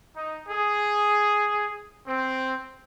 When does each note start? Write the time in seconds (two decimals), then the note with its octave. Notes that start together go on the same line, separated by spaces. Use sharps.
0.16 D#4
0.49 G#4
2.07 C4